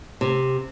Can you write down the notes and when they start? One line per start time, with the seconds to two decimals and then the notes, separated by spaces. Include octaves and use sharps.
0.21 C3